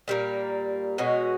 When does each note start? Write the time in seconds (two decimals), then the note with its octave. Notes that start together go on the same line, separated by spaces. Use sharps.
0.08 A#2 G3 A#3
0.98 B2 G#3 C#4 F#4